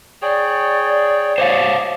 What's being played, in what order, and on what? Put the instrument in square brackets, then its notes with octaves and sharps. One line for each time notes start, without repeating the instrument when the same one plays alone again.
[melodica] G#4 C#5 G5 [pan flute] D5
[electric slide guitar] C5 C#5 F5 [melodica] D#5 D6